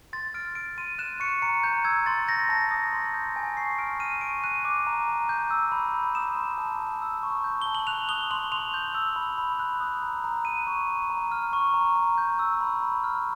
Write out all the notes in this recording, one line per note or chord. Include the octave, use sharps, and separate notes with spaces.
C6 A6
F6 D7
F6 D7
C6 D#7
F#6 E7
C#6 C#7
A#5 C#7
A#5 G6
E6 G#6
C6 A6
G6 A#6
A5 A#6
D#6
C6
G6
G#5
C#6 C7
F6 D7
F6 D#7
C#6 D7
F#6 D#7
D6
A#5
A#5
G6
E6
B5
B5
D#6 E7
C6
A5
A5
E6
C#6
G6
A5 G7
F#7
F#6 F7
D#6 G7
C6 F#7
C6 F7
G6
E6
B5
B5
F#6
D#6
A#5
A#5
F#6 D#7
C#6
A#5
A#5
F6
C#6
A#5
A#5
G6
E6
B5
B5
F6